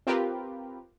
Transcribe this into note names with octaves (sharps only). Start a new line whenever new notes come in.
C4 F4 G4 A#4 B4